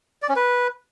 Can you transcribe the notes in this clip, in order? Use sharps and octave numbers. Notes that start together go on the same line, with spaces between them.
D5
C#4
B4